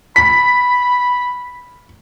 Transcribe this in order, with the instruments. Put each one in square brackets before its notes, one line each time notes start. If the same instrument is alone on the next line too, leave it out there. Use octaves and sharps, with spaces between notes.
[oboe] B5 [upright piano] B6